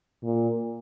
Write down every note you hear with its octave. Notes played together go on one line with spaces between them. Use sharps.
A#2